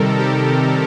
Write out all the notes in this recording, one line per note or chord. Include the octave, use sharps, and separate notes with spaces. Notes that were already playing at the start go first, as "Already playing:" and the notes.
Already playing: C3 D#3 G3 A4 A#4
G4